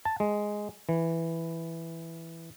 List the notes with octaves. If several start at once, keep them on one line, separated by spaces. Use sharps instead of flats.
A5
G#3
E3